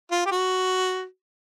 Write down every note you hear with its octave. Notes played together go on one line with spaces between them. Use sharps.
F4
G4
F#4